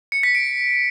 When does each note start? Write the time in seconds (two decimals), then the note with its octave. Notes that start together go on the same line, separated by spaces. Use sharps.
0.12 C#7
0.23 B6
0.35 D7